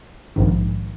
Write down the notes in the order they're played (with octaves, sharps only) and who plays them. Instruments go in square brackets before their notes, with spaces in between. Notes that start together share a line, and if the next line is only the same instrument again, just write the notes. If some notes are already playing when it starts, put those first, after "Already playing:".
[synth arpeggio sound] A#1 G#2 D#3